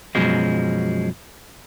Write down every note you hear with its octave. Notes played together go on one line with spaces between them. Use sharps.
F#2 B2 F3 F#3 G#3